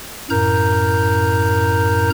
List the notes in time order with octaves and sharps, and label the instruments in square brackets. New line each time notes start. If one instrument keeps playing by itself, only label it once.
[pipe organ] F#2 A2 A#4 A#5 G6